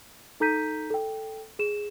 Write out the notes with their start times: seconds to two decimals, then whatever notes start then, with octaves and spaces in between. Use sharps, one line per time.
0.40 D#4 A4 A#5 G6 B6 D#7
0.90 A4 G5
1.59 G#4 E7